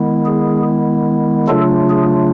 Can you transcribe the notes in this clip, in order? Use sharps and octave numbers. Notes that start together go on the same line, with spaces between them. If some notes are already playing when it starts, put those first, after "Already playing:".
Already playing: D#3 G#3 B3 E4
G#4
C#3 F#3 A3 D4 F4 A4
G#4